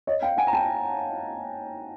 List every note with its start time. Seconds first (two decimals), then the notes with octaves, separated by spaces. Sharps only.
0.07 C#5 D#5
0.22 F5 G5
0.37 F#5 G#5
0.47 A#5
0.53 G5 A5